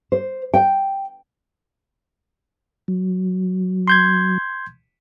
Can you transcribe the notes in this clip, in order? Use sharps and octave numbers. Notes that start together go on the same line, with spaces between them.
C5
G5
F#3
C6 G6 G#6